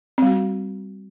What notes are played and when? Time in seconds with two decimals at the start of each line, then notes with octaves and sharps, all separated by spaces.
0.18 C4
0.22 G3
0.27 F#4